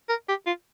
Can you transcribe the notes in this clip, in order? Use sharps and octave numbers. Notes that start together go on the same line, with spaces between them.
A#4
G4
F4